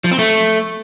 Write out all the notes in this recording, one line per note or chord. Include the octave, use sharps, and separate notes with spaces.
F3
C4
A3